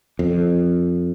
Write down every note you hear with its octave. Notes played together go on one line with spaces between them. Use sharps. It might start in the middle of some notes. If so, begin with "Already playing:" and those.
F2